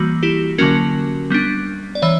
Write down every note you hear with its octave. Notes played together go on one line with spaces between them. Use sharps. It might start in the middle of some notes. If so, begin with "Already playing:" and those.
Already playing: E3 G3 A#3 F#4
E4 G4
D3 F#3 A#3 C#4 F#4 A#4
G3 B3 D4
D5
E3 C#5 E5